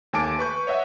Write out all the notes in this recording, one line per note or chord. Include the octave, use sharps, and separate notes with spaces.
D#2 A3 G#5 A5 D6 D7
B4 C#6 G6
C#5 D#5 E5 F#5